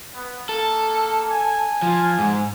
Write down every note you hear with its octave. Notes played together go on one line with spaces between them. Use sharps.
B3
A#3 A4
G#5
F3
G#2